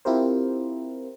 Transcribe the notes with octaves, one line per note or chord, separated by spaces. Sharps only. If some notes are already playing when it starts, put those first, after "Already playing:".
C4 E4 F4 G4 A#4 C5